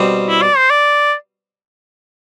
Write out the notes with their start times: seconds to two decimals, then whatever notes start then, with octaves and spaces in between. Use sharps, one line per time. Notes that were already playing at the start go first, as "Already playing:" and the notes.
Already playing: B2 G3 C4
0.28 E4
0.42 D5
0.57 C5
0.70 D5